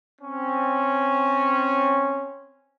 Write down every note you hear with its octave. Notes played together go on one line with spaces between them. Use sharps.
C4 C#4